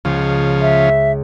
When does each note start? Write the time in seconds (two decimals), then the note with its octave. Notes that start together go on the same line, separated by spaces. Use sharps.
0.05 C#2 C#3 F3
0.61 E5